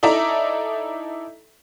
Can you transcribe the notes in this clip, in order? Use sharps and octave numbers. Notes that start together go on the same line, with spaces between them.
D#4 E4 A4 D5 E5 A#5